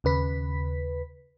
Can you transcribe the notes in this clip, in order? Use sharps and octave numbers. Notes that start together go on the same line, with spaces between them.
D#2 C#3 B4 B6